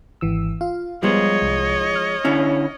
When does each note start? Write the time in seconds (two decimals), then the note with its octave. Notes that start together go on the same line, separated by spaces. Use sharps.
0.21 G#1 E3 E6
0.61 F4 F5
1.03 F3 G3 G#3 B3 C#5 D#5
1.42 C2
1.95 F6
2.24 D3 C#4 E4